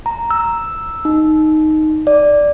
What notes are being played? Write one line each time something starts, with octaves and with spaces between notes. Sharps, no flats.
A#5
E6
D#4
D5